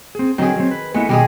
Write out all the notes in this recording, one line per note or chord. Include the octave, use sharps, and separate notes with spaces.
C4 G#4
D3 D#3 F#3 C4 G#4
F#3 C4
B4
G#3 A3 B3 E4
B2 D#3 G3 G#3 G#4